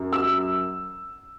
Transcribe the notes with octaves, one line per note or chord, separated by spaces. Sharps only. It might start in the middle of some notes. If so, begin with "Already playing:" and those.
Already playing: F#2
E6